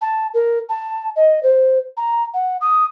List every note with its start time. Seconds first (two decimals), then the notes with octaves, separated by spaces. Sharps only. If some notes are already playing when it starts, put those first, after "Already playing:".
0.01 A5
0.34 A#4
0.69 A5
1.16 D#5
1.43 C5
1.97 A#5
2.34 F#5
2.61 D#6